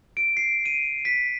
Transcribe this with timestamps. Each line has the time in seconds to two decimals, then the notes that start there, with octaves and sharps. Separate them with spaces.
0.17 D7
0.37 C7
0.66 D#7
1.05 B6